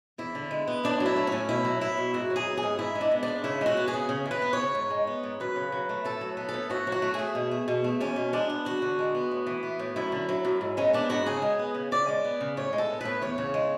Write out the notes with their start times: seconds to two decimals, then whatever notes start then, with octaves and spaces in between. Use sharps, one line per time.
0.18 E2 E4
0.35 D3
0.51 G#3
0.67 B3
0.84 A2 D4
1.00 F#3
1.06 E4
1.16 A3
1.27 A2 C#4
1.49 B2 E4
1.64 F#3
1.81 B3 E4
1.97 B2
2.14 G#2 F#4
2.30 F#3
2.36 G#4
2.47 B3
2.57 G#4
2.63 G#2
2.79 G#2 E4
2.95 G#3
3.01 D4
3.11 B3
3.23 D4
3.28 G#2
3.44 C#3 E4
3.61 G#3 F#4
3.77 B3
3.88 G#4
3.93 C#3
4.09 C#3
4.26 E3
4.31 B4
4.42 B3
4.53 C#5
4.58 C#3
4.75 G#2
4.90 G#3
5.07 B3
5.23 G#2
5.40 F#2 B4
5.56 C#3
5.72 F#3
5.89 A3
6.05 A2 A4
6.21 F#3
6.37 B3
6.49 A4
6.54 A2
6.70 A2 F#4
6.87 F#3
6.92 F#4
7.02 A3
7.14 G#4
7.19 A2
7.35 B2
7.51 A3
7.68 B2
7.84 A3
8.00 E2 C#4
8.16 B2
8.33 G#3 D4
8.50 B3
8.65 E2 F#4
8.82 D3
8.99 G#3
9.15 B3
9.31 A2
9.47 E3
9.63 B3
9.79 A2
9.96 F#2 E4
10.12 D3
10.29 F#3
10.45 F#2
10.61 G#2
10.77 G#3 C#4
10.93 B3 D4
11.09 G#2 F#4
11.26 C#3 G#4
11.42 G#3
11.59 B3
11.75 C#3
11.92 C#3 D5
12.08 G#3
12.24 B3
12.41 C#3
12.57 A2 C#5
12.73 G#3
12.78 A4
12.90 B3
13.01 A2 B4
13.22 E2 C#5
13.38 C#3
13.54 G#3